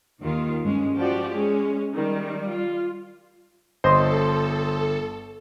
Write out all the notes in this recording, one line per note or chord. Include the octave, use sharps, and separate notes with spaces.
D#2 D#3 F4
G2 G#3 C#4
F3 F#4 G4 D5
G#3 C#4
D#3 G3
F4
G1 A4 C5 D#5 C6